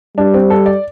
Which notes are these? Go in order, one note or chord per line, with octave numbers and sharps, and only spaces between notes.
G3 D4
C4
A4
D5